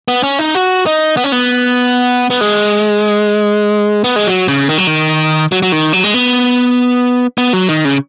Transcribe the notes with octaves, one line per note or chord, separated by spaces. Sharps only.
B3
C#4
D#4
F#4
D#4
B3
C#4
B3
B3
G#3
B3
G#3
F#3
C#3
D#3
F#3
D#3
F#3
F#3
D#3
F#3
G#3
B3
B3
F#3
D#3
C#3